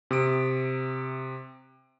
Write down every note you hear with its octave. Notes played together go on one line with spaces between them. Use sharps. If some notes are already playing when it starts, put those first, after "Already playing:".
C3 D#6 D7